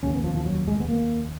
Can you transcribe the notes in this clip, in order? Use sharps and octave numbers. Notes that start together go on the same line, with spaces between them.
F1 D#2 C#3 C#4
B3
F3
F3
F#3
G#3
B3
A#3